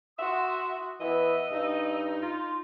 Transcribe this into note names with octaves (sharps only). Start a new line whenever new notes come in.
F#4 E5 F#5 C6 D#6
E3 B3 D#5 E6
G2 D#4
F4 C6